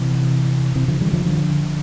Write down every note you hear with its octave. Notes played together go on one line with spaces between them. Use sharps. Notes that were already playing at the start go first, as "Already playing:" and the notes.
Already playing: C3 E3
C3 E3
D3 F3
E3 G3
D3 F3
D3 F3